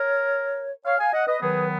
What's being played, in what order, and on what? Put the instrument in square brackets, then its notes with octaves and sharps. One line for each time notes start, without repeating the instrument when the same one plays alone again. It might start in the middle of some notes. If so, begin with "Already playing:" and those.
Already playing: [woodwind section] A#4 C#5
C#5 F5
F5 G#5
D#5 F#5
B4 D#5
D#3 F#3 B3 G#4 B4